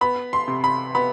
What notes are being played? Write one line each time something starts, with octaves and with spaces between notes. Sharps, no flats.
B3 B5
C6
C3
B5
B3 B5